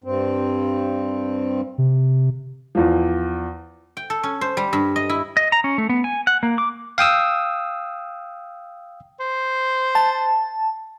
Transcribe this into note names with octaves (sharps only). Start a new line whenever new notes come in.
G2 C4
C3
E2 F3
G5
A4
C#4
C5
G3
G2
D#5
E4
D#5
A#5
C#4
A3
B3
G#5
F#5
A#3
D6
F5 G5 D#6 E6
C5
A5